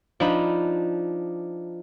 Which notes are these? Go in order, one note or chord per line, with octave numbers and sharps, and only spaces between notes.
F3 D4 D#4 B5